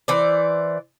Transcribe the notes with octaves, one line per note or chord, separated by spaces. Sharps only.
E3 C5 D5